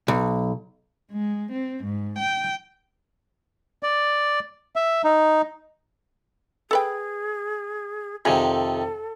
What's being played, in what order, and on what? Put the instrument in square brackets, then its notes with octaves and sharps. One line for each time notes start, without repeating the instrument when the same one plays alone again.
[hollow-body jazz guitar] B1
[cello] G#3
C4
G#2
G5
[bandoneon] D5
E5
D#4
[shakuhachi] G#4 [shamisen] A4 B4 G5
[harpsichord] F2 C3 D#3 [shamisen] G#4 [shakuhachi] A4